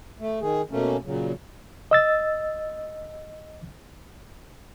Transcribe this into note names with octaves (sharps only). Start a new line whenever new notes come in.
A3
D#3 G#4
B2 A3 A#3 C#4
A#2 C#3 F#3
D#5 E6 A6